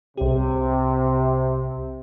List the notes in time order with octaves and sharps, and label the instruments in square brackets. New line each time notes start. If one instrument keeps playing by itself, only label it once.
[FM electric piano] C2 G4 [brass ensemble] C3